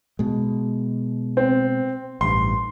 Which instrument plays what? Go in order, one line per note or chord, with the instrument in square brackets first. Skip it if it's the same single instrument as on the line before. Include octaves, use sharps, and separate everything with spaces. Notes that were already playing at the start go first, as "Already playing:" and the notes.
[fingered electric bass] B2 G#3
[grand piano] C4
[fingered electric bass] A1 G2 [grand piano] C6